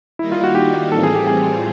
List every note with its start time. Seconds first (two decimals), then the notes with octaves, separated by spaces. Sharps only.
0.19 D#3 G3 A#3 D#4 E4
0.32 F4
0.44 F#4
0.55 G4
0.92 A2 E3 G3 C4 F4 A4
1.03 G#4
1.16 G4
1.27 G#4